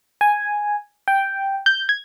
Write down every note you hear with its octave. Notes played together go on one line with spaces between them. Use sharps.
G#5
G5
G6
G#6